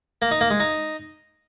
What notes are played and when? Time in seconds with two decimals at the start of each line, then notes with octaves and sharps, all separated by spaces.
0.22 A#3
0.31 D#4
0.41 A#3
0.50 G#3
0.60 D#4